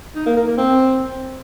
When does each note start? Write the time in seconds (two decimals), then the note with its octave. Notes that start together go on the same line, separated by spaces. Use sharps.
0.15 D#4
0.26 A#3
0.36 A#4
0.47 A#3
0.57 C4